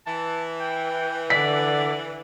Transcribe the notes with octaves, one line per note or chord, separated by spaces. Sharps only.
E3 A5
G5
D3 D5 B6